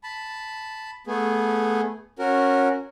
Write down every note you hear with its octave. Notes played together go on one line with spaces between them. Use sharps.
A5 B5
A3 B3 G#4
C#4 F#4 A#4